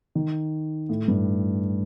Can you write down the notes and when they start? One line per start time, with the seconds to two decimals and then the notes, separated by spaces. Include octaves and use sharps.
0.15 D#3
0.89 A2
1.08 G2